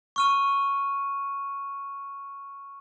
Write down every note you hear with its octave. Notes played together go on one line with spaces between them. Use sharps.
C#6 F6 D#7